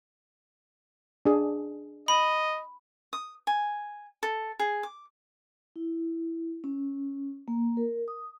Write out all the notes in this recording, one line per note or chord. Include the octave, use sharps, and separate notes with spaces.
D4 G#4
D#5 B5
D#6
G#5
A4
G#4
D6
E4
C#4
A#3
A#4
D#6